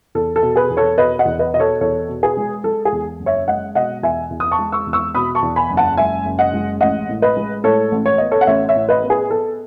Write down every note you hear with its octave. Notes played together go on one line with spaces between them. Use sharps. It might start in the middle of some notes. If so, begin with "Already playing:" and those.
E2 A4
A4
B2
G#4 B4
E2
A4 C#5
B2 B4 D#5
D#5 F#5
E2
B4 D#5
B2 D#5
A4 C#5
E2 A4 C#5
B2
G#4 B4
G#3
G#3 A4
G#4
E2
F#1
C#5 E5
G#3 D#5 F#5
B2 D#5 F#5
E2 E5 G#5
E2
D#6
A5 C#6
G#3
C#6 E6
E2
C#6 E6
B2 B5 D#6
A5 C#6
E2
G#5 B5
F#1
F#5 A5
G#3 E5 G#5
F#1
D#5 F#5
G#3
A1 D#5 F#5
A2
B4 D#5
G#3
A2 A4 C#5
A1
C#5
B3 D#5
A4 C#5
F#5
A1 C#5 E5
C#5 E5
A2
B4 D#5
B3
G#4 B4
B3 A4